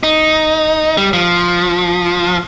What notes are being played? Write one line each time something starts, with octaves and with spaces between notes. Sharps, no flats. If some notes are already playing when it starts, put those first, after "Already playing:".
D#4
G3
F3